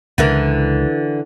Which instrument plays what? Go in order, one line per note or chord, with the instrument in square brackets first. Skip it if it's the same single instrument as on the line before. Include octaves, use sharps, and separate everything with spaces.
[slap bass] C#2 [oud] D3 E3 A#4